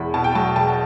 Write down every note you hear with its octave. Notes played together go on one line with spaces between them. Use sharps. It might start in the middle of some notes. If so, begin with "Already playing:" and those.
Already playing: E1 E2 B5
B2 A5
G5
F#3 A5
E1 A5